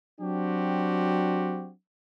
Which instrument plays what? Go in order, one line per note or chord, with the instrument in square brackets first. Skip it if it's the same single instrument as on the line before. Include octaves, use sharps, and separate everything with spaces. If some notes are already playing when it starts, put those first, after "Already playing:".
[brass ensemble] F#3 C4 D4 F#4 G4